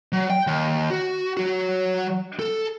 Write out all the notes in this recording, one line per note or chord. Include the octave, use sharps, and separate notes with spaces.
F#3
G5
D#2
F#4
F#3 F#4
A4